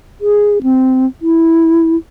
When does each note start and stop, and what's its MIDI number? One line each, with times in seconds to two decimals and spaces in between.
0.21 0.63 68
0.63 1.06 60
1.22 1.96 64